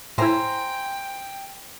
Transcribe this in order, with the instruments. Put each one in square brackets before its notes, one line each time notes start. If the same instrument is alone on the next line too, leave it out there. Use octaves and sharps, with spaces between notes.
[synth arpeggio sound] A2 E4 [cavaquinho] C5 G#5 A#5 [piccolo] G5